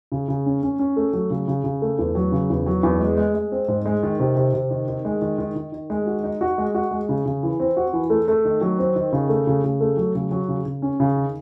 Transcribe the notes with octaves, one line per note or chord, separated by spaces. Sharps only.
C#3
C#3
C#4
C#4
C#4
A3
F#3
C#3
C#3
C#3
A3
E2
F#3
C#3
E2
F#3
E2
G#3
G#3
G#3
C4
G#2
G#3
D#3
C3
C3
C3
D#3
D#3
G#3
D#3
D#3
D#3
D#3
G#3
F#4
D#4
F#4
G#3
F#4
G#3
C#3
C#3
E3
C4
F#4
E3
A3
A3
D#3
F#3
C4
D#3
C#3
A3
C#3
C#3
A3
F#3
C#3
F#3
C#3
C#3
C#4
C#3
D#3